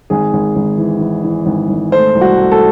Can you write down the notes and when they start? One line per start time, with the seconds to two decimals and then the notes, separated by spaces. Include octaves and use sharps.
0.10 G#1 G#4
0.33 G#1
0.56 G#1
0.78 E3
1.00 E3
1.24 E3
1.46 G#1
1.69 G#1
1.92 A3 C5
2.15 C2
2.21 F#4
2.38 A3
2.52 A4